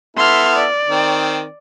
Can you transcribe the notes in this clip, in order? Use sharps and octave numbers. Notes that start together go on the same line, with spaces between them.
B3 E4 A4 C6 F6
D5
D#3 C4